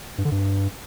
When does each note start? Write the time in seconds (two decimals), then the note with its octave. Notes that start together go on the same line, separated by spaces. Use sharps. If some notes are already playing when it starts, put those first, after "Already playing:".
0.18 G2
0.25 D3
0.32 G2